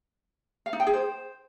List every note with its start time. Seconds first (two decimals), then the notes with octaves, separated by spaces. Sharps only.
0.66 F5
0.73 D#4
0.80 G5
0.87 G#4
0.94 C5